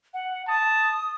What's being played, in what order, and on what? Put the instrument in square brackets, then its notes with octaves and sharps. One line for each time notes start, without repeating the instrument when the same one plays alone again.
[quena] F#5
[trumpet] A5 [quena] D#6